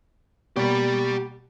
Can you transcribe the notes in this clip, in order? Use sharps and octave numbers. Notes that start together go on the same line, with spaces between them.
B2 G3 A#3 G4 B5